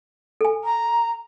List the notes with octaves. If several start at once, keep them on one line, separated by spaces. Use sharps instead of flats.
A4 G#5
A#5